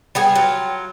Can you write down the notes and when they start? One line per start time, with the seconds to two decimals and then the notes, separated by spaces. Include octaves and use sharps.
0.15 G3 B3 G#4
0.35 F#3 F4